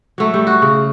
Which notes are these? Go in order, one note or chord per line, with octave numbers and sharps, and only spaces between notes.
F#3 A3
G3
F#4
C#3